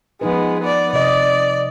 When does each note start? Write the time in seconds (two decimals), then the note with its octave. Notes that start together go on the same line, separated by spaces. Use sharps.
0.21 F3 G#3 B3 D#4 B4
0.61 B3 D5
0.93 C3 D5 D#5